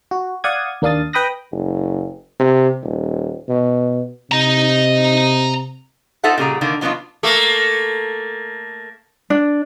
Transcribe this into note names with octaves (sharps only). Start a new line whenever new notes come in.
F#4
D5 F5 F#5 D#6 G#6
D#2 A#3 D4 F5 D#6 A6
B4 G5 B5 D#6 F#6 A#6
F#1
C3
D#1
B2
C3 D#5 A#5
D#4 F4 A4 C5 E5 F#5
A#2 C#3 G3 F4 G#4 A#5
D3 D#3 A#3
D#3 F#3 B3 C#4 D4 F4
A3 A#3
D4